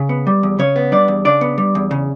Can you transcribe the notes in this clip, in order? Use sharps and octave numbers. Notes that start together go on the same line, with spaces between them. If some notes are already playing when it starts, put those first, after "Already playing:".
Already playing: C#3
B3
G3
E2
C#3 C#4 C#5
B3
G3 D4 D5
E2
C#3 D4 D5
B3
G3
E2
C#3